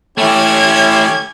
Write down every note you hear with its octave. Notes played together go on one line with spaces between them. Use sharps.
E3 A3 C#4 E4 G4 G#6